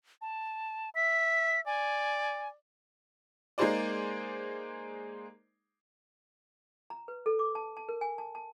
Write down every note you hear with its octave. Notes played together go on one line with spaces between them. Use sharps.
A5
E5 B6
D5 G#5
G#3 A#3 D#4 G#4 C5 D5
A#5
B4
A4
D6
A5
A5
A#4
G#5
A5
A5